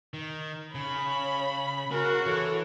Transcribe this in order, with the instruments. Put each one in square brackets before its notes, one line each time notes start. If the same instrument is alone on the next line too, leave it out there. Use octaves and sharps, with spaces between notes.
[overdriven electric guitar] D#3
[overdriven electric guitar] C#3 [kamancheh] C#4 C#5 [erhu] B5
[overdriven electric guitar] C#4 G#4 [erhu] F#4 [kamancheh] A#4
[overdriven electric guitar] E3 [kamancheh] A4 C#5